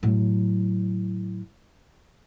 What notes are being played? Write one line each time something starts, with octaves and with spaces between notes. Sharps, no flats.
A2 F#3